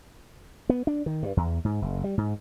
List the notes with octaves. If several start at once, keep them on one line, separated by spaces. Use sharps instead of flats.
B3
D4
D#3
G2
E2
G#2
F#1
G3
G#2